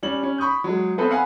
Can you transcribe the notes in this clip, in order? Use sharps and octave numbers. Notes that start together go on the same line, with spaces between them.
G3 C#4 F#7
C#4
B5 C#6 D#6 G6
F#3 G#3
B3 C4 A4 B4 C5
F5 F#5 G#5 B5